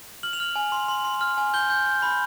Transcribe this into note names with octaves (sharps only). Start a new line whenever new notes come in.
F6 F#7
F7
F6 F#7
G#5
C6
C6
C6
F6
G#5
G6 G7
G6
G6
B5